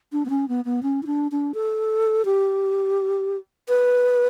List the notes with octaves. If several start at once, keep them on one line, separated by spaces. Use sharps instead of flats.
D4
B3
C#4
B3
B3
C#4
E4
D4
D4
A4
G4
B4